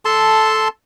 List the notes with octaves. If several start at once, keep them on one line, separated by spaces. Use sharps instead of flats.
A4 A5 C6